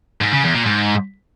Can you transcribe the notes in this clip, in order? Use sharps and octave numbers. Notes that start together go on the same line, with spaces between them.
G#2
C#3
E2
A#2
G#2